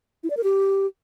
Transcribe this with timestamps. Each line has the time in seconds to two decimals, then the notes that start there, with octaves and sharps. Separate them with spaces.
0.24 E4
0.30 D5
0.37 A#4
0.44 G4